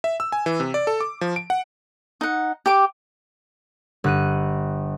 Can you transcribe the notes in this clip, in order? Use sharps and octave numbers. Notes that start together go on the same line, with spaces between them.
E5
E6
G#5
E3
C3
D5
A4
D6
F3
D7
F#5
D#4 F#5
G4 D6
G1 F#6 D#7